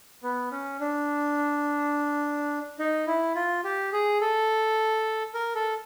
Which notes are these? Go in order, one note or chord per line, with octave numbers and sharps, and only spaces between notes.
B3
C#4
D4
D#4
E4
F4
G4
G#4
A4
A#4
A4